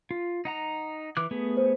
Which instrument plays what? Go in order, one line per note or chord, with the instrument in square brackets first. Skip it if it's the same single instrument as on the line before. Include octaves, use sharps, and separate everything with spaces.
[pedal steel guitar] F4
D#4 F#5 A#5
E3 D6 F#6
A3 B3 G#4
[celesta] C5